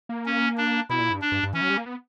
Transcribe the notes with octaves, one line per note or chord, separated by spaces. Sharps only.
A#3
C#4
D4
B2 E4
A#2
G2
D4
G2
G2
E3 C#4
F#3
G3
A#3
B3